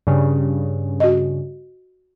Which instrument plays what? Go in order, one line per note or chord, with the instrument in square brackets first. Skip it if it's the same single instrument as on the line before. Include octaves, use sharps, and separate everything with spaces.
[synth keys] G2 C#3
[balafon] F#4 D#5